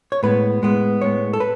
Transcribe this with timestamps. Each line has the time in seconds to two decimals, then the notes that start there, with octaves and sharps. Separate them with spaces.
0.12 C#5
0.23 A2 G#3 B3 B4
0.62 A2 G#3 B3
1.01 A2 G#3 B3 C#5
1.33 A4
1.40 B4